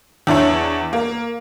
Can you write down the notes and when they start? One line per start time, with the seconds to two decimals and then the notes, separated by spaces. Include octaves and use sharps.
0.27 E2 D4 E4 C#5
0.93 A#3